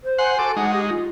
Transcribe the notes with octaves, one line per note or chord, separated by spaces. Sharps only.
C5
F#5 G#5 C6
F#4 A4 D6
G#3 D#4 F#5
G4
F4